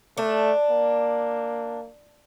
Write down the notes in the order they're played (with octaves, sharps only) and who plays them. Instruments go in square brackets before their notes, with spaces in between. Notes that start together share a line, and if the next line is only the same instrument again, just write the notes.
[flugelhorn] A3 [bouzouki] D4
[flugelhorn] A#3